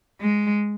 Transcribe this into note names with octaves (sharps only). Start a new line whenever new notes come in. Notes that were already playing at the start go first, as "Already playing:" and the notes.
G#3